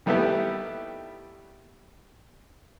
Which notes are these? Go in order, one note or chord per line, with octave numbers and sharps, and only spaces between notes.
D#3 G3 A3 B3 E4 G4